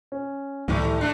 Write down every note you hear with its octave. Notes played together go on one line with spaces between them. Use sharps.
C#4
C#2 A2 D#3 G3 A3 D6
A3 D4 E4